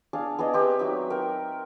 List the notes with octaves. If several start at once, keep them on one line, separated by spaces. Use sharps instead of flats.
D4 G#4 F5
B3 G#4 D5 D#5
C4 G4 B4 E5
F#3 D#4 E5
A#4 G5